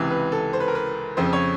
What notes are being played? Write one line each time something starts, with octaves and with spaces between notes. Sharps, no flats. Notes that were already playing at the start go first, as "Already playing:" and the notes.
Already playing: C#2 C3 E3
B4
A4
C5
B4
A#4
B4
F2 C#3 F3 C5
C#5